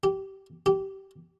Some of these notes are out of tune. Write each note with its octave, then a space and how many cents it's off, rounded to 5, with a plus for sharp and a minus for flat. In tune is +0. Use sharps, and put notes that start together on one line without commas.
G4 -20
G4 -20